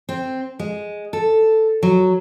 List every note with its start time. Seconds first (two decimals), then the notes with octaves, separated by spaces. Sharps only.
0.09 C4
0.59 G#3
1.13 A4
1.83 F#3